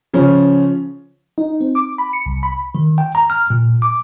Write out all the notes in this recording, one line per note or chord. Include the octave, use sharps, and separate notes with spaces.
C#3 F3 C#4
D#4
C4
D6
B5
C#7
C2
B5
D#3
G5
A#5
F6
A#2
D6